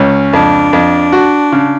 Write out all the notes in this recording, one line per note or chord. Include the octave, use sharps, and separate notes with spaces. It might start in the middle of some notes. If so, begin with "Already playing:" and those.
Already playing: C#2 C#4
F2 D4
F2
F#4
C#3